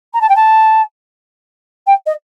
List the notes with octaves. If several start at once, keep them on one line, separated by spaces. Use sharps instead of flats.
A#5
A5
G5
A5
G5
D#5